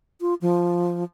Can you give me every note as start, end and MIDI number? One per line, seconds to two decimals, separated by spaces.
0.21 0.34 65
0.41 1.04 53